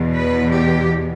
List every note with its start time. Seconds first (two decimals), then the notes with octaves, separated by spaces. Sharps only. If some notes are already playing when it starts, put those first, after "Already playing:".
Already playing: E2 B2
0.13 B4
0.51 G4